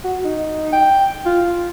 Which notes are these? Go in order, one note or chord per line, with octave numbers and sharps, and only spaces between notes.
F#4
D#4
G5
F4